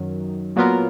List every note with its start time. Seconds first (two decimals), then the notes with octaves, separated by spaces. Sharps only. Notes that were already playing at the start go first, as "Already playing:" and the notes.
Already playing: F#2 D#3 F#3
0.56 A#2 F#3 B3 F4 A#4